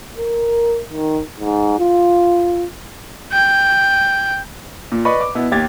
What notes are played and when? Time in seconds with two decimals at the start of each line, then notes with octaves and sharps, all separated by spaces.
0.18 A#4
0.90 D#3
1.40 G#2
1.79 F4
3.32 G5
4.92 A#2
5.05 B4 D5 D#5 B5 C#6
5.21 D6
5.35 B2 B3 E4
5.52 D#2 G4 G#6 A6